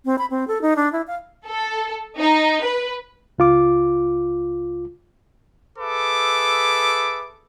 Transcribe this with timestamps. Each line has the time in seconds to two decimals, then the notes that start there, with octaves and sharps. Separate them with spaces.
0.05 C4
0.18 B5
0.31 C4
0.48 A4
0.62 D#4
0.76 D4
0.93 E4
1.07 F5
1.47 A4
2.19 D#4
2.63 B4
3.38 C#2 F4 D6
5.79 G#4 A4 B4 E5 D6